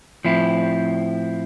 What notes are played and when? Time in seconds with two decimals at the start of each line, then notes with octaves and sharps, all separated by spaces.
0.25 A2 F3 C4 E4